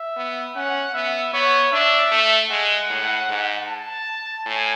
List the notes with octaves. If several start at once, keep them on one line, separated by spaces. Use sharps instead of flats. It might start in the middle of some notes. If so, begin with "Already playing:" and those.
Already playing: E5
B3
C#4 F#5
B3 E5
B3 C#5
D4 E5
A3
G#3 F#5
A2
G#2
A5
A2 G#5